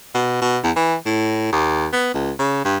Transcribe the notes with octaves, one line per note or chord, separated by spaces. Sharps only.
B2
B2
E2
E3
A2
D#2
B3
C#2
C#3
G2